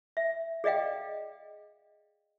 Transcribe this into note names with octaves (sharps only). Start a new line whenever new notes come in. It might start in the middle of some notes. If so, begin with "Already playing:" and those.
E5
G#4 D5 D#5 F5 G5